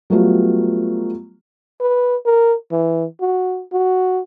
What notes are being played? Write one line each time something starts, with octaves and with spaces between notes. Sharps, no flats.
F#3 G3 A3 B3 F4 F#4
B4
A#4
E3
F#4
F#4